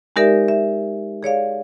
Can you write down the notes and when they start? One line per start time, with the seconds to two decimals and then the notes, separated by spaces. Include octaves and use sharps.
0.16 G#3 D#4 G4 A#4 D5 E5
0.48 E5
1.23 G#4 C#5 D5 F5